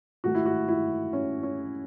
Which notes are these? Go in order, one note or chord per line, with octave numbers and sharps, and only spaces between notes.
G#2 D#3 A3 F#4
E4
F#4
E4
C#4
C#4